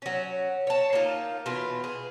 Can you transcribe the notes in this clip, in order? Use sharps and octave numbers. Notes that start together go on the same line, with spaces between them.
F#3 C#4
C#5 A5
A#3 D#4 F4
B2 E3 F4
G#4